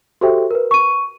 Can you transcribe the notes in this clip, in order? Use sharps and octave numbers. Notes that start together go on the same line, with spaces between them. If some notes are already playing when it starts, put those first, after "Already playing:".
F#4 G4 A4 C5 E5 G5
A#4 B4
C#6 D#7